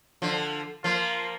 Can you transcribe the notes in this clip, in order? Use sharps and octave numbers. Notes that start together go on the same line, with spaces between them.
D3 F3
F3 A#3 F4